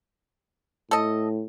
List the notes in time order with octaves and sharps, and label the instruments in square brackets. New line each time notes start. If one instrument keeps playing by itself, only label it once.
[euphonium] A2 [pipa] A4 D#5